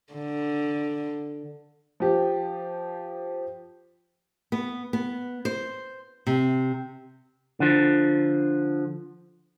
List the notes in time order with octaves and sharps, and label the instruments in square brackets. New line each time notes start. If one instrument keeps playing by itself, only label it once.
[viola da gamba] D3
[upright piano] F3 G4
[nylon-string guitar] B3
B3
C5
C3
[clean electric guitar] D3 F3